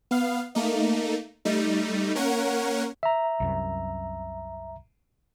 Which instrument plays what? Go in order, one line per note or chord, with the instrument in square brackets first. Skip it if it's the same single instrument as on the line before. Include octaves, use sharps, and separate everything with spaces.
[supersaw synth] B3 F5
A3 A#3 D#4
G3 A3 D#4
A#3 C#4 A#4 C#5 F#5
[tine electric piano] E5 A#5
[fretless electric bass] C2 F#2 C3